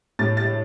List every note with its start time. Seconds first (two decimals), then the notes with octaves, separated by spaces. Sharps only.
0.19 A2 A6
0.37 A6